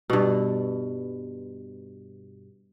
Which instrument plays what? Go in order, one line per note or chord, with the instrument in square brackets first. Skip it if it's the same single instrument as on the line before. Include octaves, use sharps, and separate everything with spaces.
[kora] G2 B2